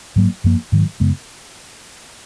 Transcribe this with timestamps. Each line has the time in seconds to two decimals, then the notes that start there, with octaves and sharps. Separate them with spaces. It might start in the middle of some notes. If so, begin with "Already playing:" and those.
0.16 G#2 F#3 A#3
0.44 F#2 F3 A#3
0.72 G#2 D#3 F#3
1.00 F#2 C#3 G#3 B3